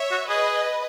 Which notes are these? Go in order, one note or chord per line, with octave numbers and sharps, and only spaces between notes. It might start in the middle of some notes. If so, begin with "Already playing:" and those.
Already playing: C#5 E5
F#4
G#4 B4 D#5